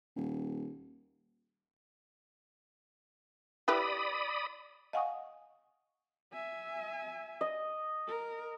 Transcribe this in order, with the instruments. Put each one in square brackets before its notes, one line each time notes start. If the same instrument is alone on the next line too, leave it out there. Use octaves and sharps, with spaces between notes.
[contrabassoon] D#1
[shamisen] E4 G4 B4 [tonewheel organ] D5 B5 D#6
[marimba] D#5 F5 F#5 G#5 C#6 D#6
[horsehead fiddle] E5 G#5
[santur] D#5
[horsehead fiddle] A#4